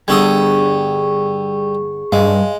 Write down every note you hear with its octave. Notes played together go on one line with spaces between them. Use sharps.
G2 D3 G3 B3 G#4 A4 C#6 D#6
G2 G#3 F5